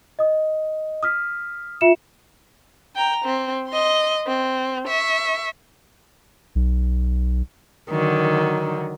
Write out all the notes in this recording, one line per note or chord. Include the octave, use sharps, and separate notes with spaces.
D#5 D#6
D#6 F6 B6
F4 E5 C#7 E7
G5 A#5
C4
D#5 C6
C4
E5 C#6
B1
D3 D#3 F#3